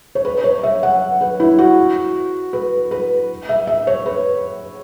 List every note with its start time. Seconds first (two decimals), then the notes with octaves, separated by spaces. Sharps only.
0.15 C#5
0.25 B4
0.44 C#5
0.63 E5
0.83 F#5
1.21 B4
1.40 E4
1.58 F#4
2.53 B4
2.91 B4
3.49 E5
3.67 E5
3.87 C#5
4.06 B4